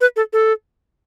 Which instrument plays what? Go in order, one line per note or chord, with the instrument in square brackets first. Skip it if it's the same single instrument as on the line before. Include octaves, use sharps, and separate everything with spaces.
[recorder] B4
A4
A4